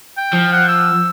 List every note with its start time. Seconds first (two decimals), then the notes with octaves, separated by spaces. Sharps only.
0.17 G5
0.33 F3
0.53 F#5
0.69 E6